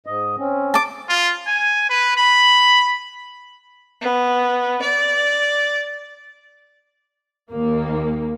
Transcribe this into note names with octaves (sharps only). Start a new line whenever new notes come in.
G#2 D#5
C4 C#4
A5 D6
F4
G#5
B4
B5
B3
D5
D#2 A#3